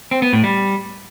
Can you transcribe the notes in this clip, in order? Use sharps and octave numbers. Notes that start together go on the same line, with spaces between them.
C4
B3
A2
G3